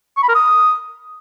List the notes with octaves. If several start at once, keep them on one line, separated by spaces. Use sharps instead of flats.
C#6
B5
A#4
D#6